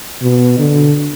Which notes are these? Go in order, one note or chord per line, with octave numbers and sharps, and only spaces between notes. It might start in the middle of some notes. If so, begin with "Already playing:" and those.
B2
D3